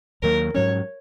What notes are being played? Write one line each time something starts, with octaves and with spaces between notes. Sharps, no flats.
D#2 D#3 F#3 A#3 A#4
G#2 F#3 C#4 C#5